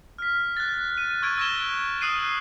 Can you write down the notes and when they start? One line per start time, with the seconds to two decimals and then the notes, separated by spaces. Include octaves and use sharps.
0.18 F6 B6
0.57 F#6 A6
0.98 D#7
1.22 C#6 E6 G#6 D7 D#7
1.38 E6 F#6 A#6 D7 E7 G7
2.01 D#6 E6 F#6 C7 D7 D#7